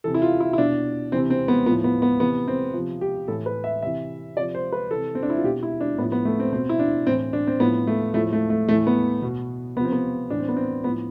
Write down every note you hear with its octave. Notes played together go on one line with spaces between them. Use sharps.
C3 E3 A4
E4
F4
E4
E4
B2 D4
C3 E3 C4
C4
B3
A2 F3 B3
B3
B3
C3 E3 B3
C4
C3 F3
G4
A2 E3 A4
B4
E5
C3 E3 E5
C3 F3 D5
C5
B4
C3 E3 A4
C4
D4
E4
F4
B2 G4
E4
D4
A2 F3 B3
B3
A3
C4
B2 C4
E4
D4
A2 E3 C4
D4
C4
A2 F3 B3
A3
A2 F3 A3
A3
A3
A2 E3 A3
B3
B2
C3 F3 B3 C4
B3
A2 E3 D4
C4
B3
C4
A2 F3 B3